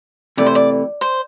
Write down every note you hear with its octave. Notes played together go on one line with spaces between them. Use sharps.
C3 E3 A3 D5
C5
D5
C5